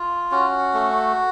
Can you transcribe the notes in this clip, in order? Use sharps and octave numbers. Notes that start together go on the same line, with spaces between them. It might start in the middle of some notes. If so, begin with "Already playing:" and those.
Already playing: F4
C#4 F#4
A3